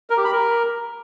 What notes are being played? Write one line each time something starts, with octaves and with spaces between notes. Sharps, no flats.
A#4
G4
B5
A#4